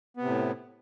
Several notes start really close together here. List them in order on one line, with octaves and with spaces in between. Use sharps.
B3 C3 A2